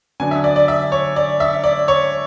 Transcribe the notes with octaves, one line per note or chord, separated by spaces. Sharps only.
D3 F#3 B3 D4 G#5
E5
D5
D5
E5
C#5
D5
E5
D5
C#5